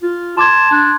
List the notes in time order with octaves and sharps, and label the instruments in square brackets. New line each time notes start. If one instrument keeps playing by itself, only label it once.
[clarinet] F4
[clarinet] A5 [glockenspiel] C6 D6 G#6
[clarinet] D4